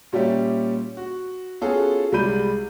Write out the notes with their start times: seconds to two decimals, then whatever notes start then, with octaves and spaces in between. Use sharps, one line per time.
0.12 A#2 G3 C#4 G4 E5
0.97 F#4
1.61 B3 C#4 F4 F#4 G#4 A4
2.12 C2 G3 G#3 B5 G6 D#7